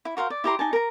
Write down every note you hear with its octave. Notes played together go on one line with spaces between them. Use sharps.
E4
F#4 A#4 C5 F5
D5
E4 G4 A#5 C6
D#4 G#5 A5
A#4 A#5